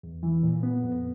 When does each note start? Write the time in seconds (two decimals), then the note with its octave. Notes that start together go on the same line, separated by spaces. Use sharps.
0.03 E2
0.23 E3
0.43 A#2
0.63 B3
0.83 F2